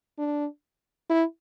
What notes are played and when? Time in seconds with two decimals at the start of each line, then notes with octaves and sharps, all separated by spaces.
0.18 D4
1.10 E4